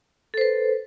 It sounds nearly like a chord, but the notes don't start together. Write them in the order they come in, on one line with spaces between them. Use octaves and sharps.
A4 C5 B4